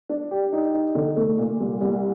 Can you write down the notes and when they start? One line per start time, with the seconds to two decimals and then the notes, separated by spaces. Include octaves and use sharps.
0.09 D4
0.31 G4
0.53 D#4
0.74 D#4
0.95 D3
1.17 A3
1.38 A#2
1.60 C2
1.81 C2